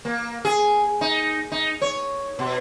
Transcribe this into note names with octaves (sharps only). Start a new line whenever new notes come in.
A#3
G#4
D#4
D#4
C#5
B2